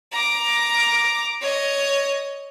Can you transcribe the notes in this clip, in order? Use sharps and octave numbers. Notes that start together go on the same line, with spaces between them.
A#5 D6
C#5 D#5